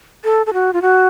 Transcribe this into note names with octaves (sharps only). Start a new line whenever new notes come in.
A4
A4
F#4
F4
F#4